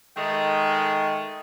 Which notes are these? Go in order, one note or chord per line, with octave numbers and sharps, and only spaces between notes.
D#3 G#3 A3